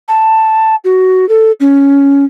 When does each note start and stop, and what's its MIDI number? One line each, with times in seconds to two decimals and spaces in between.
0.08 0.76 81
0.84 1.28 66
1.29 1.52 69
1.60 2.25 61